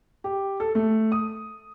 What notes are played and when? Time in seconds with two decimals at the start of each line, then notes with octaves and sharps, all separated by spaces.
0.24 G4
0.60 A4
0.75 A3
1.12 D#6